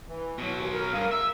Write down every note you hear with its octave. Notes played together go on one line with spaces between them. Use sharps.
E3
B2 F#3
D#2
A#4
G2 G#4 F5
E5 E6